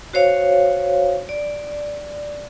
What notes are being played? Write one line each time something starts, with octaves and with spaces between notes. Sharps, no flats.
F#4 C5 C#5 F5
D5